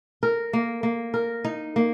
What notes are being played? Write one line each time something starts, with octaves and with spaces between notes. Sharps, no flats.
A#4
A#3
A#3
A#4
D#4
A#3